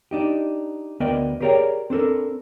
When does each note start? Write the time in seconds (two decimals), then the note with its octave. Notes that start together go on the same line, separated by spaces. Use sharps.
0.11 D4 D#4 G4
1.00 D2 B3 A#4 D5 D#5 G5
1.41 G4 G#4 A#4 C#5 D5 G5
1.90 C4 D4 A4 A#4